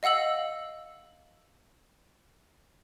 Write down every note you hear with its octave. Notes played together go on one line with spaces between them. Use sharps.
D#5 F5 F#5 E6 F#7